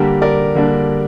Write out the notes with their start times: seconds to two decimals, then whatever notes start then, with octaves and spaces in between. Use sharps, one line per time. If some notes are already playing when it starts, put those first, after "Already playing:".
Already playing: D3 G3 A#3 D4 G4 A#4
0.22 A#4 D5
0.55 D3 G3 A#3 D4